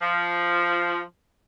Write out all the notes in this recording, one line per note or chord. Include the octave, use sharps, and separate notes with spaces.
F3